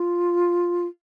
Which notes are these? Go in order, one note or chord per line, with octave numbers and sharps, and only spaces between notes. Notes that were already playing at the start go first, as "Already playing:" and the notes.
Already playing: F4